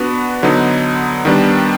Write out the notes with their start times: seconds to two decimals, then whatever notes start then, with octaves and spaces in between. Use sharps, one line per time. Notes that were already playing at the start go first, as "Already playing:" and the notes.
Already playing: B3 D4 F#4 B4
0.43 D3 F#3 B3 D#4
1.25 D#3 G3 B3 D4